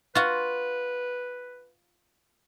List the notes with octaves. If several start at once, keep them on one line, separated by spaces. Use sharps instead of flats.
F4 F#4 B4